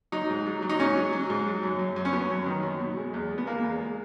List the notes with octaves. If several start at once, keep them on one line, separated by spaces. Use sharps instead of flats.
F#3 D#4
G#2
F#3
F#3
D#4
G#2 C#4
F#3
F#3
G#2
F#3
F#2
F#2
F#2
C#4
F#2 B3
F#2
D#3
F#2
B2
G#3
E2
G#3
B3
G#3 A#3
E2
G#3